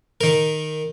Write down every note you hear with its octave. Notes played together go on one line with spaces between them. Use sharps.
D#3 A#4